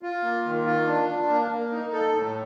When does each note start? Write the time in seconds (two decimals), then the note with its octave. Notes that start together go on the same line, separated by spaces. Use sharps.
0.03 F4
0.23 A#3
0.45 D#3
0.66 F4
0.87 D4
1.08 D4
1.30 A#3
1.51 A#3
1.72 D#4
1.93 A4
2.14 A2